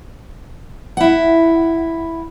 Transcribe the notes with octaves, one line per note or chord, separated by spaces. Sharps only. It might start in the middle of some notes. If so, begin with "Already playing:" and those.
E4 F#5